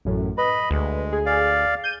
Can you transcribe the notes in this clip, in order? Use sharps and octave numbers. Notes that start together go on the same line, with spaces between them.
A1 F#2 A2
B4 D#5 B5
D2 G#3
G#4
D5 F5
G6 D#7